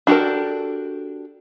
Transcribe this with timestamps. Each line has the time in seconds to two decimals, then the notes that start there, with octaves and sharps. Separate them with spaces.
0.07 D4 F#4 G4 A4 A#4